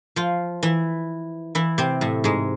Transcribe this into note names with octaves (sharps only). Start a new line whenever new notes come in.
F3 F4
E3 E4
E3 E4
C3 C4
A2 A3
G#2 G#3